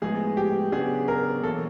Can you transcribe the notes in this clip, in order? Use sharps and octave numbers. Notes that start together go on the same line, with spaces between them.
A2 F3 G#3 B3 G#4
G4
C#3 F#3 B3 D4 F#4 G#4
A#4
E2 B2 F#3 A#3 A4